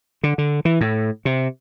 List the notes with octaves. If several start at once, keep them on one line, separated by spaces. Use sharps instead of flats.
D3
D3
E3
A2
C3